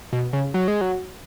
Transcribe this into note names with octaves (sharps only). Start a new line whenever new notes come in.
B2
C#3
F#3
G#3
F#3